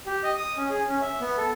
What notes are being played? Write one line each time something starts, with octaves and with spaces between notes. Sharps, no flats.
G4
D#5
D#6
C#4
G#4
C#4
E5
B3
A4